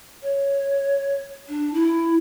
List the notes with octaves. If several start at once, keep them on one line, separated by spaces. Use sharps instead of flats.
C#5
D4
E4